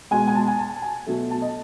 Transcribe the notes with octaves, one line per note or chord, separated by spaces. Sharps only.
B2 G#3 G#5
G#5
A5
G#5
A5
G#5
B2 F#3 A3
A5
D#5